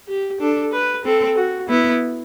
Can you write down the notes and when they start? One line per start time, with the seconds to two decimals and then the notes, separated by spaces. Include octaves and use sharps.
0.08 G4
0.40 D4 A4
0.73 B4
1.05 C4 A4
1.37 F#4
1.69 B3 E4